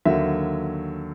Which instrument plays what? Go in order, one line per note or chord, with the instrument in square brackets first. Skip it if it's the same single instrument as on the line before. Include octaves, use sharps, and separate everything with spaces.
[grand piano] D#2 D3 F#3 E5